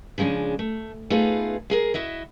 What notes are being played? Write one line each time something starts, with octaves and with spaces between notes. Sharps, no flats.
C#3 F3 G#3 C#4 D4
A3
A3 B3 D#4 F4 G#4 B4
G#3 G#4 A#4
E4 F#4 D#5 E5